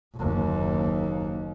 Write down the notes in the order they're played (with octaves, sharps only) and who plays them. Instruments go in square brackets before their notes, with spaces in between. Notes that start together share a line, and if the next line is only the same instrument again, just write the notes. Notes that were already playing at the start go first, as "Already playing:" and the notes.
[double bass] F#1 D#2